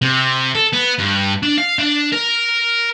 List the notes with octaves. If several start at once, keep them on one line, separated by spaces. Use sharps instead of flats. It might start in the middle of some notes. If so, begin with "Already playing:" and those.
C3
A4
B3
G2
D4
F5
D4
A#4